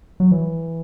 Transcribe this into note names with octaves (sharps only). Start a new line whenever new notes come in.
F#3
E3